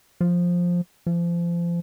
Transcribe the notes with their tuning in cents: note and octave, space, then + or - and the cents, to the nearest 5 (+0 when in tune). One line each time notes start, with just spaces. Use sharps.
F3 +10
F3 -30